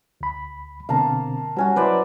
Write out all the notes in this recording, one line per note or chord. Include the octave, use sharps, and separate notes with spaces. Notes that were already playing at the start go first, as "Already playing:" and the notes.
D2 B5
B2 D3 A#3 C4 F5 A5 A#5
F#3 G3 C#4 F#4
F#3 E4 B4 C5 D5 E5